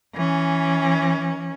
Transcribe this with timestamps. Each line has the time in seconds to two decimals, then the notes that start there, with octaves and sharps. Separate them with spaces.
0.14 E3 C#4